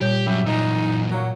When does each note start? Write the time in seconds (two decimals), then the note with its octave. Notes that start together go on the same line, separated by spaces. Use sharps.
0.01 A#2 G3 G4 C#5 G6
0.27 F#2 G4 E5 B5
0.46 F#2 A#2 E3 D#4
1.10 F#3 A#3